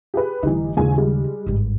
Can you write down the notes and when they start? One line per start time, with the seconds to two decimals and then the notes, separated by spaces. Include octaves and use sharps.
0.14 G4 G#4 B4
0.43 F1 D3 E3 G3 D#4
0.77 A#1 D#2 C#3 G#3 G#5
0.98 G3 G#3
1.47 G#1 G2